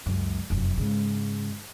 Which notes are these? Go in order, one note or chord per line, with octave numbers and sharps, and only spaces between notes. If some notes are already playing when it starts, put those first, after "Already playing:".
C#2 F#2
F1 F#2
G#2 C#3